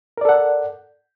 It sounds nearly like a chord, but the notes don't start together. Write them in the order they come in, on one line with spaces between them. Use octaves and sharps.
A#4 D5 A4 F#5